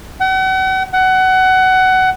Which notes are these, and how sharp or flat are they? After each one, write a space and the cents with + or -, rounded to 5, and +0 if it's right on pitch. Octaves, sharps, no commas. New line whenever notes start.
F#5 +40
F#5 +20